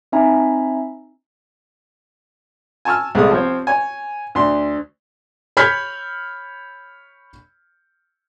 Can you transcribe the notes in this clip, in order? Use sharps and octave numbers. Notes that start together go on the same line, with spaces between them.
C4 D#4 E5 G#5 A#5 B5
G#5 A5 C#6 E6 F6
C2 G#3 A3 D#6
F3 C4 C#5
C#5 G#5
D2 C6
C#5 B5 F6 G6 G#6 B6